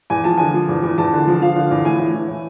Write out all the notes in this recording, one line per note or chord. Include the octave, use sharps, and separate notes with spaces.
E2 G#5
F3 A5
D3 G#5
F3
E2
E2
E2 A5
D3
F3
F3 F5
D3
E2
A2 G#5
A2
E3
A2